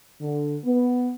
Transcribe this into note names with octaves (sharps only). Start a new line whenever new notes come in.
D3
B3